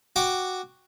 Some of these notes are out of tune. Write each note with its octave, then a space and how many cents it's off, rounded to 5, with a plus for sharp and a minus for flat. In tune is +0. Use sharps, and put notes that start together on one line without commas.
F#4 +0 G5 +0 D6 +0